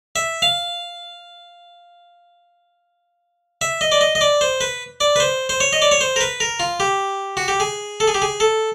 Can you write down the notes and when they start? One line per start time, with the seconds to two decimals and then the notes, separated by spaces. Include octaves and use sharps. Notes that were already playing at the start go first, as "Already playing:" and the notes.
0.16 E5
0.42 F5
3.61 E5
3.81 D#5
3.92 D5
4.01 D#5
4.15 D#5
4.21 D5
4.41 C5
4.61 B4
5.00 D5
5.16 B4
5.20 C5
5.49 C5
5.60 C#5
5.73 D#5
5.82 D5
5.91 C#5
6.01 C5
6.16 A#4
6.21 B4
6.40 A#4
6.60 F4
6.80 G4
7.37 F#4
7.48 G4
7.60 G#4
8.00 A4
8.08 G#4
8.15 G4
8.22 G#4
8.40 A4